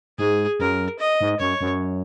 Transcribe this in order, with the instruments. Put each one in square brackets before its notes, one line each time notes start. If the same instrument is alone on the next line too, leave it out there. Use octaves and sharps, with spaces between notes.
[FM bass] G#2 [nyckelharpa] G#4
[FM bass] F#2 [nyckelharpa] A#4
[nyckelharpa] D#5
[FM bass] G#2
[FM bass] F#2 [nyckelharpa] C#5
[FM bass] F#2